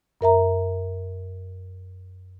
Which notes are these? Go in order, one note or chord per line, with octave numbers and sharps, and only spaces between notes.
F#2 A#4 E5 A#5